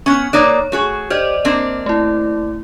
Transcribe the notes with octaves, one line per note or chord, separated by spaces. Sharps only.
B3 C#4 C#6 F6
A#3 D#4 C#5 D5
A3 F#4 G#4
G4 C5 D5 D#5
A#3 C4 D4
A3 E4